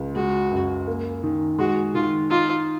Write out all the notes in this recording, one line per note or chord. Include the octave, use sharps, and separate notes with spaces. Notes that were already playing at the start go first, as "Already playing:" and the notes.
Already playing: C#2
G#3 F#4
F#2
A#3
D#3
G#3 F#4
D#3 F4
D#4 F4